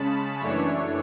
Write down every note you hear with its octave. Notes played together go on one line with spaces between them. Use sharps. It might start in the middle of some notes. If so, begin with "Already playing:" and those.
Already playing: C#3 G#3 C#4 A5 B5
F#2 E3 A3 D4 C#5